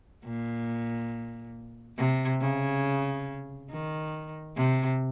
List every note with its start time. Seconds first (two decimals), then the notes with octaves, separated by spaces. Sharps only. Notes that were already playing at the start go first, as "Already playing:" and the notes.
0.25 A#2
1.98 C3
2.41 C#3
3.70 D#3
4.56 C3